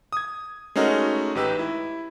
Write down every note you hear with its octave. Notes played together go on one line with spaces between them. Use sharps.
D#6 G#6
G#3 A3 C#4 D#4 F#4 A#4
A1 D#4 G4 B4 E6
E4